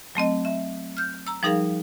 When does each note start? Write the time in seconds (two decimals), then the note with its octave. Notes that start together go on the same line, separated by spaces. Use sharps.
0.15 F#3 A3 C4 D#5
0.45 E5
0.97 F6 G6
1.27 A#5 E6
1.43 F3 G3 D#4 G#4 A#4 F5